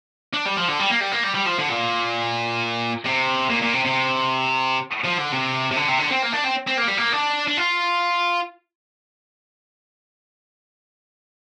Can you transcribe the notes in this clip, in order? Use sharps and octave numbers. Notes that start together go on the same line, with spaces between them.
D4
G3
F3
D3
G3
A#3
G3
A#3
G3
G3
F3
D3
A#2
C3
A#2
A#2
C3
C3
F3
D3
C3
C3
D3
C3
D3
C4
A#3
D4
C4
C4
A#3
G3
A#3
D4
D4
F4